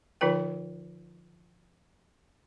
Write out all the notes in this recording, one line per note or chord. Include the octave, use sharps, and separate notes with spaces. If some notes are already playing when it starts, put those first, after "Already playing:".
D3 F3 D#4 F4 B4 G5